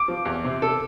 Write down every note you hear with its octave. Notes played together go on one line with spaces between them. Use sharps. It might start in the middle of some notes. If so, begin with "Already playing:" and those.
Already playing: D6
F3
E2
C3
A4